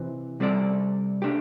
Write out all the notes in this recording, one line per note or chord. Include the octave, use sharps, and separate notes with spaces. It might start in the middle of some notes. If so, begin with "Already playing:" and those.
Already playing: C3 E3 C4
C3 G3 C4 A4 D5
A3 D4 G4